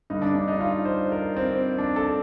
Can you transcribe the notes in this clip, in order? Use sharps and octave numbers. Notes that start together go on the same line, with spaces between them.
G2 D3 D#4
D4
D4
D#4
F4
C5
A#4
C4
D4
A4